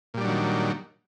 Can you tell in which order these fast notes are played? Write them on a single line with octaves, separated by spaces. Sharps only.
A#2 G3 D4 F#3 D#3